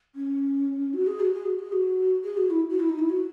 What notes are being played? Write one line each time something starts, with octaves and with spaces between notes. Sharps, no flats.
C#4
F#4
G#4
F#4
G#4
F#4
G#4
F#4
G#4
F#4
E4
F#4
E4
D#4
E4
F#4